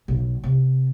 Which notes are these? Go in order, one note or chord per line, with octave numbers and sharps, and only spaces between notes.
B1
C3